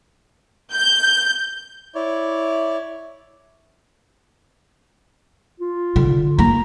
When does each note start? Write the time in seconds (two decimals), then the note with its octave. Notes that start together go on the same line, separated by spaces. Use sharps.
0.71 G6
1.95 E4 C#5 D5
5.60 F4
5.96 D3
6.39 A#3 A#5